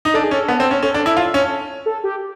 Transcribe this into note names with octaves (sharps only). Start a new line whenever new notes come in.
D#4
D4 A4
G#4
C#4 A4
B3
C4
C#4
C#4 A4
D4
E4
F4
C#4
A4
G4